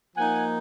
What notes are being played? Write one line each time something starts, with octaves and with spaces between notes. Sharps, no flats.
F3 A#3 D#4 F#5 G#5